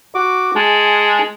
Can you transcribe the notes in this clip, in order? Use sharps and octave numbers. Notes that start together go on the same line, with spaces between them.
F#4 D6
G#3 G#5 A5